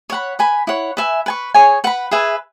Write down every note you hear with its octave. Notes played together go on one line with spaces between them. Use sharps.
C#5 F#5 B5
B4 G#5 B5
E4 C#5 F#5
B4 E5 G#5
B4 G#5 C#6
G#4 C#5 G#5
B4 F#5 B5
G#4 B4 E5 G#5